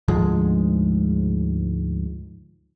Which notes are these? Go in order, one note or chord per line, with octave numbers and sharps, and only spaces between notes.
D2 G#2 F3 G#3